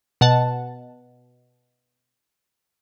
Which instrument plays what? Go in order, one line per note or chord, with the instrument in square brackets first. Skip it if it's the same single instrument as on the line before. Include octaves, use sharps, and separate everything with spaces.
[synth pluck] B2 F#5 A5